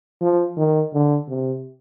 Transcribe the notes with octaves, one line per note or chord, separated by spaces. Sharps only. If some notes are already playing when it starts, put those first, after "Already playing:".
F3
D#3
D3
C3